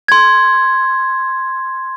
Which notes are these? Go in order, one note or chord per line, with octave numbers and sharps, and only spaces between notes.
C6 G#6